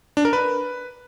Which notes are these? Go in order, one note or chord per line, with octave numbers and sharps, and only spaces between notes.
D4
A#4
B4